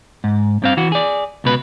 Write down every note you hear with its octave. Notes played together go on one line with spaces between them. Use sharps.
G#2
G2 C4 F5
E3 F#4
G#4 D5
C#2 B2 B4